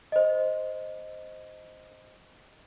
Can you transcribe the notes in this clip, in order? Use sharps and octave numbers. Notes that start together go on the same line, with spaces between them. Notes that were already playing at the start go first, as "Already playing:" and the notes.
C5 D#5